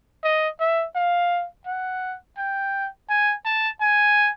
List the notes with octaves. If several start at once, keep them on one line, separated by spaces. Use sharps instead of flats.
D#5
E5
F5
F#5
G5
G#5
A5
G#5